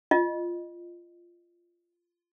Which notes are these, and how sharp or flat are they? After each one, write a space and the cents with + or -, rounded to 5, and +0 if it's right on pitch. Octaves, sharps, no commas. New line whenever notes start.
F4 -10 D#5 -20